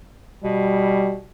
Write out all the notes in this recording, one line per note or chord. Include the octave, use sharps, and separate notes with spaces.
B2 G3